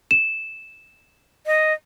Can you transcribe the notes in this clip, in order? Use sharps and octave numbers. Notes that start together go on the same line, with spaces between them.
E7
D#5